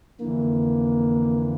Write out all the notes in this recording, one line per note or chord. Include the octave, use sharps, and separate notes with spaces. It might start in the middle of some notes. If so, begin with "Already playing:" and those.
F2 D3 E3 A#3